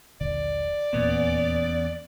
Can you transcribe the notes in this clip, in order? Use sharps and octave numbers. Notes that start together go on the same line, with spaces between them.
D#1 A#1 D3 D5
D#1 E2 A#2 A#3 B3 C#4